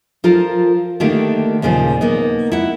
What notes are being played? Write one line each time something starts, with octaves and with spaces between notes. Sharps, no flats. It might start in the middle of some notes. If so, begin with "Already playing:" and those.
F3 F4 A4 A#4
D3 D#3 A3 A#3 G4
D#2 A#2 C#3 E3 F3
A#3 B3 D#4
E4 F#5